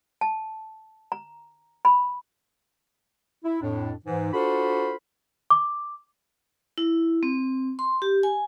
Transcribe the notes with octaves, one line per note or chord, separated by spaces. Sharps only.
A5
A#5
B5
E4
F2 A2 D4
G#2 E3
D4 F4 F#4 A4 C5 B5
D6
E4
C4
C6
G4
G#5